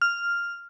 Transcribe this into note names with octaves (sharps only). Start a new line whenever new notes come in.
F6